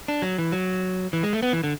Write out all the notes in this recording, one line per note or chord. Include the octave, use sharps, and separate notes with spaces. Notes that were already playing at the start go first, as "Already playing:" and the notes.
D4
F#3
E3
F#3
E3
G#3
A3
B3
E3
D3